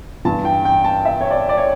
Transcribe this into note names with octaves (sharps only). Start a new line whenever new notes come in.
G2 E3 A5
G5
G5
A5
E5
C#5
D5
D5
C#5